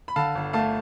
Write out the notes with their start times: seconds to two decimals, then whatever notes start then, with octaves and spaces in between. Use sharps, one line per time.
0.08 B5
0.16 D3 F5 A5
0.35 G1
0.53 A3 F5 A5